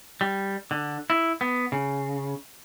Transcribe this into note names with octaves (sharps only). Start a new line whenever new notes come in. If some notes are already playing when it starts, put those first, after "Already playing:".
G3
D3
E4
B3
C#3